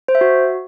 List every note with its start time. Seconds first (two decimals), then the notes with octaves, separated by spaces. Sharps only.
0.08 C5
0.15 E5
0.21 F#4